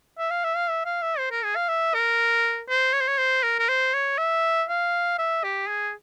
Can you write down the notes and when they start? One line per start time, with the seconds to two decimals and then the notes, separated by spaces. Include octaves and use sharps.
0.19 E5
0.31 F5
0.44 E5
0.56 F5
0.69 E5
0.86 F5
1.02 E5
1.19 C5
1.31 A#4
1.44 G#4
1.56 F5
1.69 E5
1.94 A#4
2.69 C5
2.93 C#5
3.01 C5
3.08 C#5
3.18 C5
3.43 A#4
3.59 A#4
3.69 C5
3.94 C#5
4.18 E5
4.69 F5
5.19 E5
5.44 G4
5.69 G#4